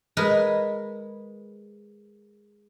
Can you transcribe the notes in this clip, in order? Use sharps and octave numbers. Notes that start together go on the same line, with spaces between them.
G#3 A#4 B4